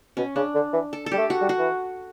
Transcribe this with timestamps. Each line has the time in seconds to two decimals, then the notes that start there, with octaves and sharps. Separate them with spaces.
0.17 B2 C#4
0.36 C#3 D4
0.55 D3
0.73 E3
0.93 A4
1.06 A4
1.11 G3 G4
1.18 A3
1.30 F#4
1.42 G3
1.49 F#4
1.59 E3